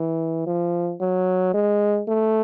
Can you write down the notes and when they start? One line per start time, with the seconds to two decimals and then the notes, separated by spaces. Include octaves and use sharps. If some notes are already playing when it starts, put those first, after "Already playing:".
Already playing: E3
0.47 F3
1.01 F#3
1.54 G#3
2.08 A3